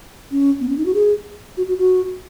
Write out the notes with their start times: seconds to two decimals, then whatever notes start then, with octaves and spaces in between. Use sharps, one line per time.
0.31 C#4
0.60 B3
0.69 C#4
0.77 D#4
0.86 F#4
0.94 G#4
1.57 F#4
1.68 F#4
1.79 F#4